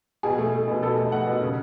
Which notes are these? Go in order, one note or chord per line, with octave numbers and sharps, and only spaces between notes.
B2 G#4
A3
A3
B2
B2 A4
A3 D#5
A3 F#5
B2
C#3